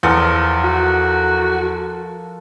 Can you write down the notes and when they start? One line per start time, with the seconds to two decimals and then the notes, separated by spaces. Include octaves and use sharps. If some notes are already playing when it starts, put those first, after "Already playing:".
0.03 E2 F3 A4 A#4
0.64 F#4